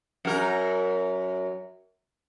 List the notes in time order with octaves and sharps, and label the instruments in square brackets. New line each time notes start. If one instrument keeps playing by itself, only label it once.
[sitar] F#2 A#4